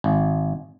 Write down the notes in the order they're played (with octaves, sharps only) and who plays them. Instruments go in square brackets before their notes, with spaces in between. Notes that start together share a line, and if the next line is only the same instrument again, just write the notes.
[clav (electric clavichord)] G#1